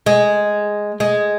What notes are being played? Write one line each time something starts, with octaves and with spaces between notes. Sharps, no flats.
G#3
G#3